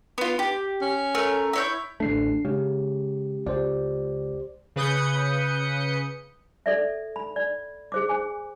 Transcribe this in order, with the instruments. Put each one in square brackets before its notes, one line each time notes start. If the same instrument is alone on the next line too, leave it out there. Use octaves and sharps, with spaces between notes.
[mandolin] B3 F4
G4
[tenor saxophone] C#4
[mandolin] A3 A#4
E4 C#5 G6
[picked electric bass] A1 D2 A3 [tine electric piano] D4 C7
[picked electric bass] C#3 [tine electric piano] G#3 G4
[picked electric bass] C#2 [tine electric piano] G4 C5 D5
[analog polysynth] C#3 B4 D#6 G6 C#7
[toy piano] A4 D5 E5
B5
D5
G#4 C5 D6
C5 G#5